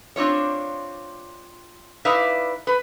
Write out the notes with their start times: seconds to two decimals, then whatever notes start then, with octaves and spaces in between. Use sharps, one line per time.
0.16 C4 D4 F4 C#5
2.05 D#4 E4 B4 D5 E5 F5
2.67 B4